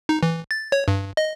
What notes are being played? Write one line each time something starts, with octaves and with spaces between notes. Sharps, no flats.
D#4
E3
A6
C#5
G2
D#5